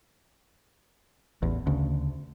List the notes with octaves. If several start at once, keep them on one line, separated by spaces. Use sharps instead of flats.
A1 E2
D2 C#3